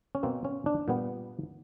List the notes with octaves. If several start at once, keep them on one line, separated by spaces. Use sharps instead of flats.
C#4
B2 F#3 A#3 C4
C#4
D4
A#2 G3 B3